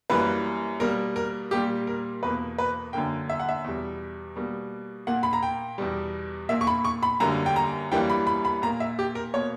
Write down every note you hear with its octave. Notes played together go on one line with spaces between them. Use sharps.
F#2 E3 G3 A#3 B4
B2 G3 A#3 A#4
A#4
A#2 G3 A#3 G4
A#4
E2 B2 A#3 B4
B4
F#2 D3 A#3 G5
E5
F#5
E5
E2 B2 G3
B2 G3 A#3
A#2 A#3 F#5
B5
A#5
G5
E2 B2 G3
A#2 A#3 E5
C#6
B5
C#6
B5
F#2 D3 G3 A#3 A#5
G5
A#5
F#2 E3 G3 A#3 G5
B5
B5
B5
A#2 A#3 A#5
E5
G4
A#4
B2 A#3 C#5